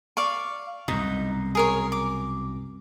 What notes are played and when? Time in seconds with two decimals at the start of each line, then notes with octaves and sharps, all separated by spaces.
0.17 D5 F5 C#6
0.88 C2 F#2 B2 D#4
1.55 G#4 A#4 C#5
1.92 D6